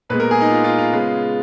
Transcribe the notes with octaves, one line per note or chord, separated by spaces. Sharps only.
A#2 G#3 B3 B4
A#4
G#4
D#4
F4
F4
F4
C#3 G#3 B3